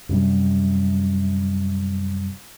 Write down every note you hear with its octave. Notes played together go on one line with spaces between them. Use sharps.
F#2 C3 G3